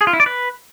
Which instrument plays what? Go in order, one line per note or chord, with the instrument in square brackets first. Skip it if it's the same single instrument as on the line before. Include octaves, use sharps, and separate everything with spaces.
[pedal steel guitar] G#4
F4
E4
D5
B4